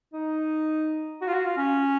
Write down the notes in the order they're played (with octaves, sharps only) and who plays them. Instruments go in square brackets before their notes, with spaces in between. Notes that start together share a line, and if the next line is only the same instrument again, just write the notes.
[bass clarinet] D#4
F#4
F4
F#4
F4
C#4